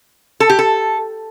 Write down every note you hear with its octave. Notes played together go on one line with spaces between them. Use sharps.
A4
G4
A4